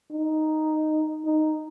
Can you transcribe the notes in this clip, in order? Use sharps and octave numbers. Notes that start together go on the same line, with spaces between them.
D#4
D#4